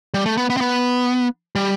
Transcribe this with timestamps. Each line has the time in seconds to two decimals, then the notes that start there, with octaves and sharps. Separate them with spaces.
0.14 G3
0.26 A3
0.37 B3
0.50 B3
0.57 C4
0.61 B3
1.56 G3